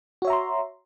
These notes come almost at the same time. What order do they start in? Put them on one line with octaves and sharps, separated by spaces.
F#4 C#5 E5 A#5 C6